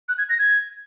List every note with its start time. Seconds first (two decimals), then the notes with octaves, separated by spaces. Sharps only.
0.09 F#6
0.18 G#6
0.29 A#6
0.39 G#6